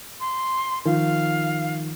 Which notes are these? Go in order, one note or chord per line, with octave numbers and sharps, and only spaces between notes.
C6
D#3 F3 F5